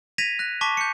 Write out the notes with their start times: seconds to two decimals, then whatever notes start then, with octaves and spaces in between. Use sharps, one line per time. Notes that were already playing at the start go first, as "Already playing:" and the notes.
0.18 G#6 A#6 B6 D#7 F7
0.39 F#6 A#6
0.61 A5 C#6 D6 B6
0.77 G6 C#7